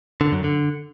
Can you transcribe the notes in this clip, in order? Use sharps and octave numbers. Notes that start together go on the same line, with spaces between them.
D3
F#2
D3